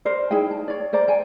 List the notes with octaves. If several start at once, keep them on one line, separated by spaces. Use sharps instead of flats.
A#4 C5 D5
D#4 E4 G#4 G5
A5
C#5 D5
A#4 C5 D5 A#5
C5 G5 G#5